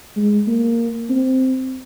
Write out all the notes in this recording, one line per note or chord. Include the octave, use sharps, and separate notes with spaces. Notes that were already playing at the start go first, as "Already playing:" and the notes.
G#3
A#3
C4